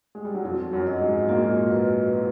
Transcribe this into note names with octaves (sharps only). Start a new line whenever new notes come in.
G#3
G3
F#3
F2 F3 F#4
F#2 F#3
D#5
G#2 G#3
A#2 A#3 F#4
B4
E4